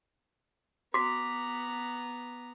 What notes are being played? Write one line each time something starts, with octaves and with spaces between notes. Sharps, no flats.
B3 F#4 A#5 D6 B6